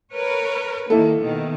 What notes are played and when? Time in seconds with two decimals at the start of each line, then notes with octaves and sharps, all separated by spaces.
0.12 A#4 B4 C#5
0.90 D#3 A#3 E4 A4
1.19 B2 D#3